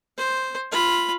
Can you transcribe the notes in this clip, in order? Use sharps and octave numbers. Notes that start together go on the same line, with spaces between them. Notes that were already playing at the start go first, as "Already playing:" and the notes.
C5
F4 B5